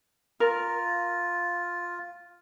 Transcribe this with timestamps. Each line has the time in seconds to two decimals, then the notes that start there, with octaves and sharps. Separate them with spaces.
0.40 F4 A#4